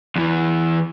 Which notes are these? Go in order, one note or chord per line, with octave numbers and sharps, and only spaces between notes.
E2 E3